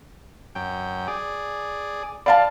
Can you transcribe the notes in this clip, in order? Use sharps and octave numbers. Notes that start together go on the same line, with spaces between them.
F#2 G5
G#4 D5
D5 F5 A5